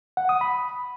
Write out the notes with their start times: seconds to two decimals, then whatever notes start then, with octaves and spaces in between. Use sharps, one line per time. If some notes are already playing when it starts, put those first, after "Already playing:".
0.17 F#5
0.29 D#6
0.41 B5